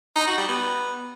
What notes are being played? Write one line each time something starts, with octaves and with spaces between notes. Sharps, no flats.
D#4
F#4
G3
B3